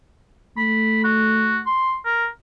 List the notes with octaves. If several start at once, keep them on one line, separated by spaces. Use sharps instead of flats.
A3 B5
F#4
C6
A#4